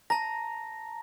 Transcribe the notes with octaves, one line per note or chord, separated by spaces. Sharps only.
A5 A#5 A#6